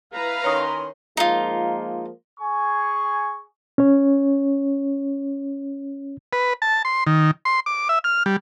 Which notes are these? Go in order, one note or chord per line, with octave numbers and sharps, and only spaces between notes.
E4 B4 F5 A#5
D#3 C#4 C#5 C6 D#6
F3 G#3 A#3 D#4 F4
G#4 G#5 C#6
C#4 C#5
B4
A5
C6
D#3
C6
D6
E5
F6
G3